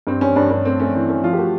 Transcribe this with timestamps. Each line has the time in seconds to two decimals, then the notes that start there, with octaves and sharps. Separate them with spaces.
0.07 G2 C4
0.21 G2 C#4
0.36 G2 D4
0.51 G2 C#4
0.65 A3 C4
0.80 A3 C#4
0.94 E3 C4
1.09 A3 C#4
1.23 F3 F4
1.33 G4
1.39 A3 F#4